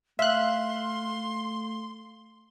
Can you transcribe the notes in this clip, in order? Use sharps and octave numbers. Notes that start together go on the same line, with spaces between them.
A3 E5 F5 C6 F#6